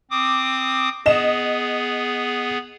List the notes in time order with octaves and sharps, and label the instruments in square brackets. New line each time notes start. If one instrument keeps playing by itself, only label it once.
[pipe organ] C4 D6 D#6
[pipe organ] B3 G#4 [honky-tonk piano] D#5 E7